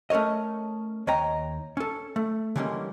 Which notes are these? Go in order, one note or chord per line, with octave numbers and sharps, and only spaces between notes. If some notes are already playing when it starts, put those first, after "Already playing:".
A3 C#4 A#4 C#5 D#5
D#2 C#5 D#5 G5 A#5
C#4 A4
A3
D3 E3 G3 G#3 A#3 C#4